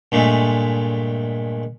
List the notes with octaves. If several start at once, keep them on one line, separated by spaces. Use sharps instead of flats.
G2 A#2 G#3 A3